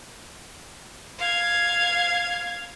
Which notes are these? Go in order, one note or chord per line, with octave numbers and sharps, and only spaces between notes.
F5 G#6